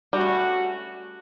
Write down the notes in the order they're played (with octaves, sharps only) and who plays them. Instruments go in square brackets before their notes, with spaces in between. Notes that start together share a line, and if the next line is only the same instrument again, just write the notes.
[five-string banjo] G3 [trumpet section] A3 C#4 F#4